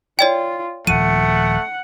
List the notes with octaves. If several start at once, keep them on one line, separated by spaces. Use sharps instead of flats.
F4 C#5 D5 G5
D#1 F3 A3 F#5 D#7